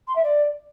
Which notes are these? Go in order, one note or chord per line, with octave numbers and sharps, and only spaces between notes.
C6
E5
D5